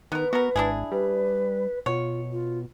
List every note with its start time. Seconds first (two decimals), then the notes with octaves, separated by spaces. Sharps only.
0.12 D#3 B3 A#4 B4
0.33 B3 F#4 A#4
0.56 G#1 D4 E4 G#4
0.92 G3 B4
1.86 B2 F4 C#5
2.32 F4